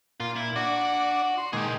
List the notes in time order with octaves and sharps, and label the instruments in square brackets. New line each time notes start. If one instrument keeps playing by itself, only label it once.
[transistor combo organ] A#2 [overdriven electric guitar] F4
[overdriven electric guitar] E4
[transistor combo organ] D4 D5 [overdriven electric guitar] F#4
[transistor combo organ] C6
[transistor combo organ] A#2 D#3 G#3 [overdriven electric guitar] G#4 G5